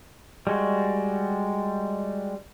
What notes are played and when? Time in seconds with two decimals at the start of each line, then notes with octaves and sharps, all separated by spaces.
0.47 G3 G#3 F#4